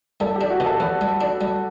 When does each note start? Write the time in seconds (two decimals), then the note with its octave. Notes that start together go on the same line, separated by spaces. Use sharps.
0.20 G3 A4
0.36 G4
0.41 D4
0.50 F#4
0.60 B2
0.66 A4
0.80 E2 B4
1.01 G3
1.21 D4
1.41 G3